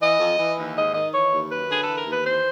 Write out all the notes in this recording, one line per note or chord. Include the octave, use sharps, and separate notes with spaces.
E3 D#5
F2
E3
D#2
G#2 D#5
D#3 D#5
E3 C#5
D#2
F#2 B4
D3 G#4
E3 A4
A#4
D#2
B4
E3 C5